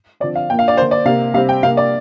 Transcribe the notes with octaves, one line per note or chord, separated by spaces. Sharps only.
D3 F3 C4 D5
F5
A#2 A#3 G5
F5
D5
D3 A#3 C5
D5
C3 A#3 F5
C3 G3 C4 F5
G5
C3 A#3 F5
D5